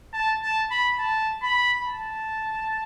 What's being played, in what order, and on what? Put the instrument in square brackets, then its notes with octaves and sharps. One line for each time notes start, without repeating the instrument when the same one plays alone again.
[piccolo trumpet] A5
A5
B5
A5
B5
A5